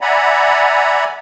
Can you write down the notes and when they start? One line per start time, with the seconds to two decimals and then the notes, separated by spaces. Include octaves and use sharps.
0.01 D5 E5 F#5 G#5 A#5 B5